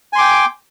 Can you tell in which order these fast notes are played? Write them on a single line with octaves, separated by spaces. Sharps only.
G#5 C6 D6 G5